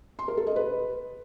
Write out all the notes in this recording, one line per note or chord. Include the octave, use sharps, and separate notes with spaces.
C6
A#4
A4
D#5
B4